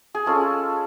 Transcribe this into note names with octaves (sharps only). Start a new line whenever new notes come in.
G#4
G#3 C#4 F4 A4